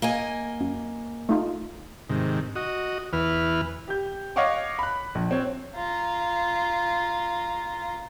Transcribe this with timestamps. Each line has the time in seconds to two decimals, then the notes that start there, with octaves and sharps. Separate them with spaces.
0.02 A#3 D#5 G#5
0.60 F#2
1.29 A3 D#4 F4
2.10 G#2 C3 D#3
2.56 F#4 D#5
3.13 E2 E3 B4 F6
3.88 G4 G6
4.36 C#5 D#5 F5 F#5 C#6 D6
4.79 B5 F#6
5.15 A#1
5.31 C4 C#5
5.75 F4 A#5